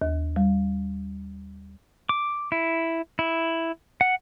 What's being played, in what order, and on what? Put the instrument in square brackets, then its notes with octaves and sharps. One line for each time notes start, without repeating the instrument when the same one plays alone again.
[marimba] D#2
G3
[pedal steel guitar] D6
E4
E4
F#5